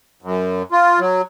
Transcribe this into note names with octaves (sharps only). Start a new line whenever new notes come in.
F#2
F4
F#3